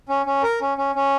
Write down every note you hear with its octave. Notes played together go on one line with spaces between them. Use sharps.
C#4
C#4
A#4
C#4
C#4
C#4